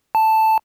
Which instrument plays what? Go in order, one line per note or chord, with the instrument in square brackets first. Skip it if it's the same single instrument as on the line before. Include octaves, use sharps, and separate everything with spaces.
[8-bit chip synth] A5